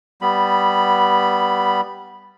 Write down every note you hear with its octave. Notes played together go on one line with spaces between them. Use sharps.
G3 B3 B5